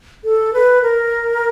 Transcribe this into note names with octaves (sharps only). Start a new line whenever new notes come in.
A4
B4
A#4